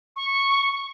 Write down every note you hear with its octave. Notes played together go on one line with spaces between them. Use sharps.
C#6